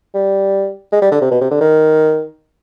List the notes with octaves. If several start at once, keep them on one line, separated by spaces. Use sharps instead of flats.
G3
G#3
G3
D3
C3
B2
C3
D3
D#3